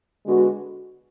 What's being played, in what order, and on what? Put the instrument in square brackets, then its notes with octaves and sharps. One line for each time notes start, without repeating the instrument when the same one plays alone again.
[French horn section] D3 G#3 B3 F#4